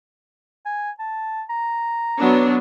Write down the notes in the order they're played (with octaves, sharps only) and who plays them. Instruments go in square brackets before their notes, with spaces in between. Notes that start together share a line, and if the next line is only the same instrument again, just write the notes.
[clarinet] G#5
A5
A#5
[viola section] F#3 B3 D4